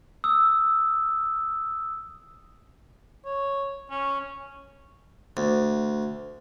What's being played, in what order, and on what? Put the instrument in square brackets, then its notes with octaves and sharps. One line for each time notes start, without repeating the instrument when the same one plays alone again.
[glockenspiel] D#6 E6
[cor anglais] C#5
C#4
[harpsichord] D2